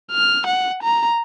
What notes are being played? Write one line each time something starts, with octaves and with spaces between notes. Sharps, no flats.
F6
F#5
A#5